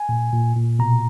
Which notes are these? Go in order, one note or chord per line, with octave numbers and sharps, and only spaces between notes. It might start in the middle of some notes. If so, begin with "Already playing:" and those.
Already playing: G#5
A#2
A#2
A#2
B2 A#5